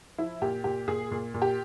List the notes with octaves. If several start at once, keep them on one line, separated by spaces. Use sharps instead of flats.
F3 E4
A#2 G4
A#2 G4
A#2 G#4
A#2
A#2
G4